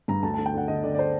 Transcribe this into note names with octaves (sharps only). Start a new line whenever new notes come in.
G2 A#5
D2 A5
D3 A5
G5
D3 F#5
D3 D#5
D3 D5
D5
C5